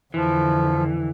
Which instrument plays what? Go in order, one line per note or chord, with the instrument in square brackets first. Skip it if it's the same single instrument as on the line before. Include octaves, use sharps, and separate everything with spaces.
[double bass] F2 D3 [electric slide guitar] E3 [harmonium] F3